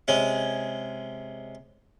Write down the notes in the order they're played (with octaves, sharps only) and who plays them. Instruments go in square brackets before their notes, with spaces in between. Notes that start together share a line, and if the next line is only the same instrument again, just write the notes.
[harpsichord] C3 G#3 C#4